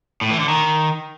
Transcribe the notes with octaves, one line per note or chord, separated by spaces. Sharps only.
A2
E3
D3
D#3